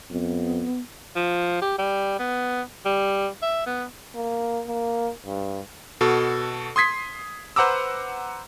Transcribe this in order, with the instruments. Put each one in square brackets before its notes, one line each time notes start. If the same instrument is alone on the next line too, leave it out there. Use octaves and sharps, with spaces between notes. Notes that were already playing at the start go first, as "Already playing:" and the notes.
[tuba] F2 [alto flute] B3
[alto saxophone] F3
G4
G3
B3
G3
E5
B3
[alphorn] A#3
A#3
G2
[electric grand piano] B2 F#4 A4
C6 D#6 G#6 B6 C7
B4 C5 F#5 A#5 D6 E6